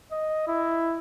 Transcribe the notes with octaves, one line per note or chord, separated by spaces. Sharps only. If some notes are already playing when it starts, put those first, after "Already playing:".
D#5
E4